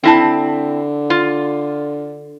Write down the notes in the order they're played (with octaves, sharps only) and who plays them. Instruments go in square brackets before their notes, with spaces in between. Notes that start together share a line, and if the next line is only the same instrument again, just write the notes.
[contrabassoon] D3 [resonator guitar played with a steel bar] C4 E4 A5
[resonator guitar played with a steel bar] F4